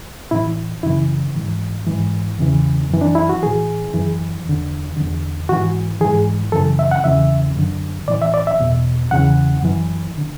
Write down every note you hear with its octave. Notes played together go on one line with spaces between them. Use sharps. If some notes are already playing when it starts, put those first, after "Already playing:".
A2 E3 E4
F#2 C#3 E3 E4
G#2 E3
G#2 E3
E2 C#3 E3
F#2 E3
D4
E4
F#4
A2 E3 G#4
F#2 E3
E2 D3
E2 D3
G#2 E3 F#4
G#2 E3 G#4
F#2 C#3 E3 A4
E5
F#5
E2 C#3 E3 E5
F#2 D3
A2 E3 D5
E5
D5
E5
E2 B2
E2 C#3 E3 F#5
F#2 E3
D3